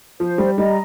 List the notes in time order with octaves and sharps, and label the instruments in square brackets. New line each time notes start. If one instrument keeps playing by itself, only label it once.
[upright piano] F3 [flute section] C5
[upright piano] G3
[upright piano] G3 [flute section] D#5 A#5